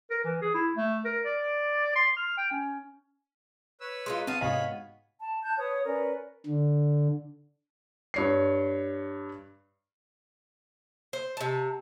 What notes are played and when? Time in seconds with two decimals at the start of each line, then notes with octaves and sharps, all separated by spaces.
0.10 A#4
0.24 E3
0.42 G#4
0.54 E4
0.76 A3
1.05 A#4
1.25 D5
1.95 C6
2.17 F6
2.37 G5
2.52 C#4
3.81 B4 C#5 E6
4.06 G#3 D#4 F4 C6
4.27 B3 C4 F#4 F5 A5 D#6
4.41 G#2 C3 C#5 D#5 F5 G#5 B5
5.22 A5
5.43 A5 F#6 G6
5.58 B4 C#5 D#6
5.84 C#4 A#4 B4 D5
6.46 D3
8.14 G2 C#5 C7
11.13 C5
11.37 C3 A5